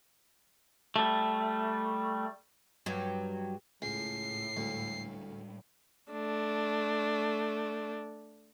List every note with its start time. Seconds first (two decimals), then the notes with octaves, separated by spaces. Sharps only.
0.96 G3 A3
2.86 G2 F#3
3.82 C#2 A2 C7
4.57 D2 G3 G#3 D4
6.12 A3 D4